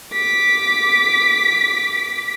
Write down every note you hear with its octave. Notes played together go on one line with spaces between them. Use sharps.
D6 B6